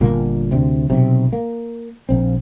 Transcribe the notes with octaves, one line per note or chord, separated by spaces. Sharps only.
G1 A#2 A#3
D2 C3
B1 C3
A#3
A#1 C4